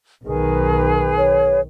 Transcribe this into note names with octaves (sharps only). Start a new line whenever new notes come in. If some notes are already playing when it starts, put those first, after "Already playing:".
B1 D#3 G#4 B4
C#5